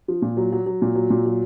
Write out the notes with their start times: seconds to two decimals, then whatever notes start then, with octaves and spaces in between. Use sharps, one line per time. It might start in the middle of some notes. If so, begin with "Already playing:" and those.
0.08 F3
0.22 A#2
0.37 F#3
0.52 F#3
0.66 F#3
0.82 A#2
0.95 F#3
1.10 A#2
1.26 F#3